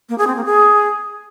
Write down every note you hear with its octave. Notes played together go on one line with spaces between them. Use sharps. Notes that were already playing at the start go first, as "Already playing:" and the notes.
A#3
G#4
C4
A#3
G#4